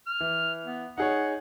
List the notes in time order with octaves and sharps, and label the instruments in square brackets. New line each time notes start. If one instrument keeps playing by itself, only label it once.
[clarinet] F6
[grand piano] E3
[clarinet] B3
[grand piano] D#4 G#4 C#5 [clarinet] F#5